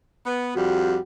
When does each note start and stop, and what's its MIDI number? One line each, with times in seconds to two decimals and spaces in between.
0.25 0.52 59
0.56 0.96 41
0.56 0.96 55
0.56 1.00 66